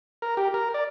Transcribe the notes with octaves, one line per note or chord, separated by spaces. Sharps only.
A#4
G4
A#4
D5